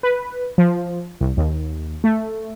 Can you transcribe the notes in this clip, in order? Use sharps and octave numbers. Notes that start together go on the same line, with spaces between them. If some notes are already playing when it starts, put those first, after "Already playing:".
B4
F3
C2
D#2
A3